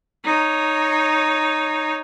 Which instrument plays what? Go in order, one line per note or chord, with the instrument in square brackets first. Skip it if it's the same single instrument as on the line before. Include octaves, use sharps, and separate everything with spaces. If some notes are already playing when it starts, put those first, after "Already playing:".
[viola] D#4 C#5